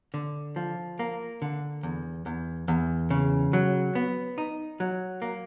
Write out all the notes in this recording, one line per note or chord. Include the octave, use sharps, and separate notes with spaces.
D3
F3
A#3
D3
E2
E2
E2
C#3
F#3
B3
D#4
F#3
A#3